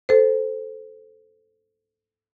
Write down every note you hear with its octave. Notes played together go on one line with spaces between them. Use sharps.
A4 C5